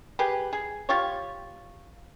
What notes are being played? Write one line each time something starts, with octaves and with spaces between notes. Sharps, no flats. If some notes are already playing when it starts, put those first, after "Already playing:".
G4 G#4 B4
G#4
F4 G4 C#5